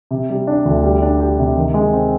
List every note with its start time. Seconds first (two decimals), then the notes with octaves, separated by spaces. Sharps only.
0.11 C3
0.30 G3
0.47 D4
0.65 D2
0.83 G3
1.02 D4
1.20 G4
1.39 C3
1.57 D#3
1.74 G#3
1.93 C4